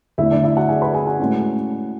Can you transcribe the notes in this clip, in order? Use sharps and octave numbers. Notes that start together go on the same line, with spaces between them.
E2 D3 A3 E4 E5
D4 D5
E4 E5
F#4 F#5
G#4 G#5
B4 B5
G#4 G#5
F#4 F#5
A2 G#3 C#4